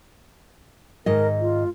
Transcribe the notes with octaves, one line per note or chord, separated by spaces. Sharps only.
G#2 D#3 A#4 D#5
F4